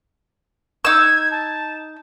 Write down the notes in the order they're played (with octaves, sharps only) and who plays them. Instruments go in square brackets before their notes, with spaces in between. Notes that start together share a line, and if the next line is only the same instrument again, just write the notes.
[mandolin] D#4 E6 [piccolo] G#6
[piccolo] A5